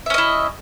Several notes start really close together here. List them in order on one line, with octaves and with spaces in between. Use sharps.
E5 C#4 D#5 E4